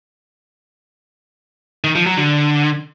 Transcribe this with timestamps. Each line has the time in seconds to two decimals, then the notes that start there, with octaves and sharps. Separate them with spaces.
1.84 D#3
1.95 F3
2.06 F#3
2.17 D3